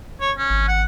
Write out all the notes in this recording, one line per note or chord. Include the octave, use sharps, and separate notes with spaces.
C#5
C#4
G#1
F#5